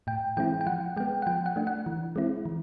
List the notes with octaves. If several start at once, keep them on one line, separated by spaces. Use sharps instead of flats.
A2 G5
E3 G#3 C4 E4 G5
G5
F3 F#5
G#3 B3 G5
F#5
F3 G5
F#5
A3 D4
F#5
E3
G#3 C4 E4
E3